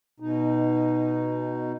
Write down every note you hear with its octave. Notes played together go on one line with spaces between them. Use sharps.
B2 D#4